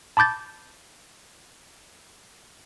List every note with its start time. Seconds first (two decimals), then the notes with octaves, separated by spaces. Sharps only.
0.17 A5 B5 D6 G6 A6